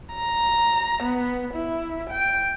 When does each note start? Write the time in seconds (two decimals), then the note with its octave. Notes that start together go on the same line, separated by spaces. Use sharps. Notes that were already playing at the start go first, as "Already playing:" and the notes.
0.15 A#5
1.03 B3
1.54 E4
2.10 G5